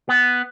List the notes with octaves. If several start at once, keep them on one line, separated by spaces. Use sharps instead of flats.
B3